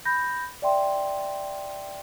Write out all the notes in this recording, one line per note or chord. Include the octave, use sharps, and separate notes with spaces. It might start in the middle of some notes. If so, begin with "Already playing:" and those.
B5 G6 A#6
D5 E5 G5 C6